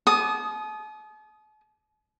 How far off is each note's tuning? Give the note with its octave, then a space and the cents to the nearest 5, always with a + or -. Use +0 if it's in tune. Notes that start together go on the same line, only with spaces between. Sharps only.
A5 -45 D#6 +0